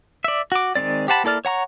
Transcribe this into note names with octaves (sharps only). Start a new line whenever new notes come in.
D5 E5
F#4 D6
D#3 G#3 B3 C4 D5
G4 C5 F#5 A5 B5
A#3 E4 A4 D5 F6
C#5 F#5 A#5 C#6